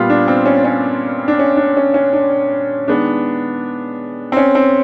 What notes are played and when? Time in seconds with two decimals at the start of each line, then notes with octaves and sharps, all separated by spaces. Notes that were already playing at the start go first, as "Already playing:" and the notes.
Already playing: A#2 G3 B3 F4
0.10 D4
0.28 C4
0.46 C#4
0.65 C#4
1.28 D4
1.39 C#4
1.57 D4
1.77 C#4
1.94 C#4
2.13 D4
2.88 D#3 G#3 B3 D4
4.32 C4
4.37 C#4
4.55 C4